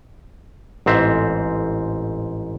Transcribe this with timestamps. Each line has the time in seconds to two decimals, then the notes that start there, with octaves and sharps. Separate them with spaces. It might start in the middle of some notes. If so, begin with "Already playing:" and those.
0.86 A1 G#2 C4 E5